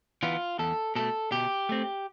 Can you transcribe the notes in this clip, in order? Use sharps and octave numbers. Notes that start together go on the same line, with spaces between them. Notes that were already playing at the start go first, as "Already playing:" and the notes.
E3 B3 F4
E2 A4
B2 A3 A4
B2 G4
A3 C4